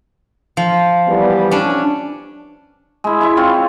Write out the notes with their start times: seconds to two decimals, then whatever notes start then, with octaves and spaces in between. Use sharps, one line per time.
0.57 F3
1.07 E3 G3 B3
1.51 C#4 D4
3.04 G#3 E4
3.21 E4 E5
3.37 C4 F4 C5 C#5